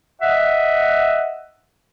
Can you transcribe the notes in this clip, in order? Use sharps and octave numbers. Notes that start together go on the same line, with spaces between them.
D#5 E5 F#5